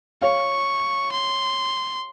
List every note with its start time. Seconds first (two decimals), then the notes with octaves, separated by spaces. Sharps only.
0.22 C#5 F5 C#6
1.12 C6